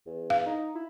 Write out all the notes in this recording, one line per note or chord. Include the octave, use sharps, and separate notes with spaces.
E2
F5
D#4
E4